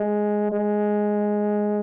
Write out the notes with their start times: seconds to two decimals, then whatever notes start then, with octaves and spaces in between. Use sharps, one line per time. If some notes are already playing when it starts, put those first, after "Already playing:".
Already playing: G#3
0.52 G#3